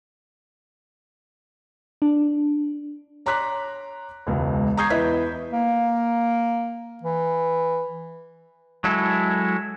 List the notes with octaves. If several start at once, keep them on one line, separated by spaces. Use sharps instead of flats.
D4
C#5 A#5 C6 D6 F#6 B6
E1 C#2
A#5 C#6 D#6 G6 G#6 C7
E2 E4 B4 D#5 E5 B6
A#3
E3
F#3 G#3 E4 A4